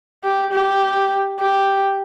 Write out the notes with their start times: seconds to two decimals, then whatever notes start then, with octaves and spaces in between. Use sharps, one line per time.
0.24 G4
0.52 G4
1.40 G4